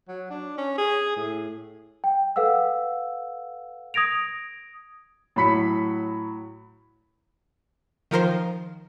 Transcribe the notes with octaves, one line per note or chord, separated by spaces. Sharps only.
F#3
D4
C#4
G#4
A2
G5
A4 B4 F5 F#5 E6
D#6 G#6 A#6 D7 F7
A2 F#3 B5 B6 C#7
D#3 F3 A#4 C5